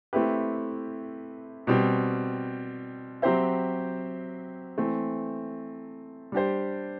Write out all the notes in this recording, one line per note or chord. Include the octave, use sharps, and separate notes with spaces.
A3 C4 E4 G4 B4
B2 G3 C4
F#3 C4 G4 C5 E5
E3 A3 C4
G3 D4 G4 C5